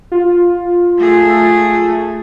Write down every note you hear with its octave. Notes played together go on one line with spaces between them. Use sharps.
F4
A3 G#4